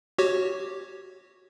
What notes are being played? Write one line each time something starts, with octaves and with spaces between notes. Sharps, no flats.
F#4 G4 C#5